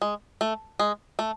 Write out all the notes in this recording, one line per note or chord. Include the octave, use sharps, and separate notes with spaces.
G#3
A3
G#3
A3